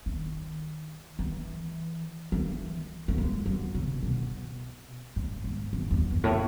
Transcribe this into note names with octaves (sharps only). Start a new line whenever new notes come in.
D#3
E3
E3
A3
G#3
F#3
C#3
B2
A2
G#2
F#2
E2
F#2
A2